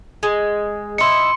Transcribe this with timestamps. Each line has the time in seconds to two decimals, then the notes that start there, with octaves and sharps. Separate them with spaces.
0.23 G#3
0.98 D#4 E4 C6 C#7